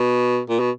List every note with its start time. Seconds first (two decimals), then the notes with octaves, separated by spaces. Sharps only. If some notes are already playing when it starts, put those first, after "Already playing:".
Already playing: B2
0.49 A#2
0.60 B2